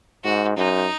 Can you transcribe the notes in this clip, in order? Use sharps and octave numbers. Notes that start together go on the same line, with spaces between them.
G#2 F#4
F#2 D#4